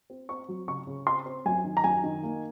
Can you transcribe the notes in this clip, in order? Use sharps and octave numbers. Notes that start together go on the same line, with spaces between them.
C4
C4 C#6
F#3
C#3 C#6
C#3
C4 C6
C4
F#2 G#5
D#3
A#5
F#2 G#5
D#3
A#3